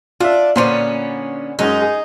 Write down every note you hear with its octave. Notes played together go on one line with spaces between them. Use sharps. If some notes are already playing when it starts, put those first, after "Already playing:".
D4 F4 E5
A#2 D3 B3 C#4 C5 D5
F#2 G#3 C#4 D#4
G#4